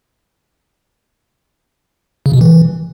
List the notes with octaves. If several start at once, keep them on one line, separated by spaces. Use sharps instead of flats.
C#3
B2
E3